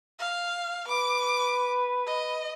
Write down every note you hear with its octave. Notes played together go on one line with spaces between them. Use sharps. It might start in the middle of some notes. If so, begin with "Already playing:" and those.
F5
B4 D6
D#5